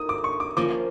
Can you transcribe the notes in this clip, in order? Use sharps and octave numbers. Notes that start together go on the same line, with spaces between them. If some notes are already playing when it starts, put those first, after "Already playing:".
Already playing: A#3 D#4 D#6
D6
C#6
D6
F3 A#3 C#4 D6